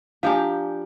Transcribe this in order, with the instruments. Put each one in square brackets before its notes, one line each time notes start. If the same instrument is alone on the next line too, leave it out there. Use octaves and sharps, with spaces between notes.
[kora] F3 G4 [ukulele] D4 A#5 [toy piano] F5 G#5